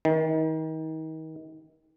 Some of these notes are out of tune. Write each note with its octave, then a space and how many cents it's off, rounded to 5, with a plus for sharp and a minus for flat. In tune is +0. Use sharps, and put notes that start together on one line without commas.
D#3 +35